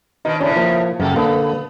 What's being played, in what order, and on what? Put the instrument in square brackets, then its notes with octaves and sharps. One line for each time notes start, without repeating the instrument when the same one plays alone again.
[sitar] B2 D#3 [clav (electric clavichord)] D#4
[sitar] A2 C#3 [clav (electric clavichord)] C#4 D4 A#5
[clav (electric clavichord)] F3 A#3
[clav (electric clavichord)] F#2 C#3 G5 [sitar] A#3 A4
[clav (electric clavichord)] D3 A#3 A4 [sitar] B3